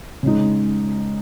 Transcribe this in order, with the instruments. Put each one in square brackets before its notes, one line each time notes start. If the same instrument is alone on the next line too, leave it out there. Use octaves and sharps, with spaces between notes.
[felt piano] C#3 G#3 D#4